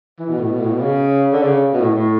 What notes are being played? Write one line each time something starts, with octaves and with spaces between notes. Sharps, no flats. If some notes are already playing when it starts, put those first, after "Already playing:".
E3
B2
A2
B2
A2
B2
C#3
D3
C#3
B2
A2
A2